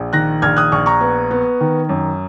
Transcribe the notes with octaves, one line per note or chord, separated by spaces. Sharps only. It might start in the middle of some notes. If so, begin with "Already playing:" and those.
Already playing: A#1
D#3 F#6 A#6
A#1 F6 G#6
D#6 F#6
A#1 C#6 F6
A#5 C#6
B3
B3
D#3
F#2